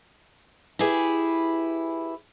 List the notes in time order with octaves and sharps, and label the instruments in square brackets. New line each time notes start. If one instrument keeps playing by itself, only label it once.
[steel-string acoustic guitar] E4 G4 G#4 B4